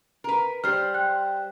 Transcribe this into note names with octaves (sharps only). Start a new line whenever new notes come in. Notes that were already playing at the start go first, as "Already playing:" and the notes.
A#4 B4
G3 C5 F6
G5 F#6